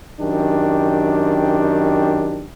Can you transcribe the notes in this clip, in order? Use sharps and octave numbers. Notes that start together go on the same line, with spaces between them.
F#2 D#3 D4 G4